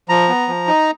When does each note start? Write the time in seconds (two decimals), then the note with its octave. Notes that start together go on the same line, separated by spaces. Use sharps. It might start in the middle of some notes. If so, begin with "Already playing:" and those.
0.09 F3 A#5
0.29 B3
0.48 F3
0.68 D#4